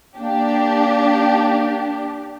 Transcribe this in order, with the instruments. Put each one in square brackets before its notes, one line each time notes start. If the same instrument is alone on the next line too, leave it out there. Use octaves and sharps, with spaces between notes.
[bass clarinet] A#3 [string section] D4 G4